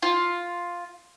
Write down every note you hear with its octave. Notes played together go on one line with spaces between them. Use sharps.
F4